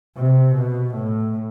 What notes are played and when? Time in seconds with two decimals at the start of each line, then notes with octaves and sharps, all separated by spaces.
0.17 C3
0.55 B2
0.95 A2